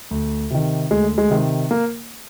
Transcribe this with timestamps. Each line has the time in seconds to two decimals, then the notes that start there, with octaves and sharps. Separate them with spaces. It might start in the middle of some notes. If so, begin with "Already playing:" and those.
0.11 D2
0.50 C3 D#3
0.91 D2 G#3
1.18 G#3
1.30 C3 D#3
1.71 A#3